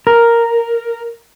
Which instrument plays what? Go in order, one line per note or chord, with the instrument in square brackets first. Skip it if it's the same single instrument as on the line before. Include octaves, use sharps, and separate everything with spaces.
[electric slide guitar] A#4